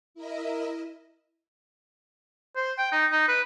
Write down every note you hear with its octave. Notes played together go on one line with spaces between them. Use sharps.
E4 A#4 D#5 E5
C5
G5
D#4
D#4
B4